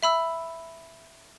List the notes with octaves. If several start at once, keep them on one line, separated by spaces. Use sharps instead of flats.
E5 B5 E6